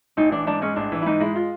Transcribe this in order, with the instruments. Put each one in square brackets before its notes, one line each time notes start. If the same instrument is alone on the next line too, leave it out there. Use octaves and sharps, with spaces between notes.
[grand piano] A1 [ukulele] D#4
[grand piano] E3 [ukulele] D4
[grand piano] G#2 [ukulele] D4
[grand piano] G#3 [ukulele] C#4
[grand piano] A1 [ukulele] D4
[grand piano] E3
[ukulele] E4
[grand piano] G#2 [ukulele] D#4
[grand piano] G#3 [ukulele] E4
[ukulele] F4